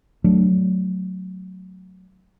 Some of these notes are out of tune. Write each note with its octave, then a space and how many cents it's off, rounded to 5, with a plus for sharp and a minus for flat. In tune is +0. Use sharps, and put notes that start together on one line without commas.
F#3 +0 A3 +0 D4 +0